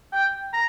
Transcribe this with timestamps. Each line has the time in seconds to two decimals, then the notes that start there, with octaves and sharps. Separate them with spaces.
0.13 G5
0.53 A#5